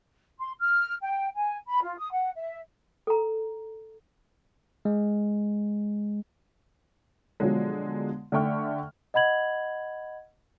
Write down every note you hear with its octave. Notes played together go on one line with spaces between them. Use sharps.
C6
F6
G5
G#5
B5
F4
D#6
F#5
E5
A4 A#5
G#3
B2 D3 F3 F#3 G#3
D3 A3 E5 G5 C#6 F6
D#5 F#5 B5 G#6 F#7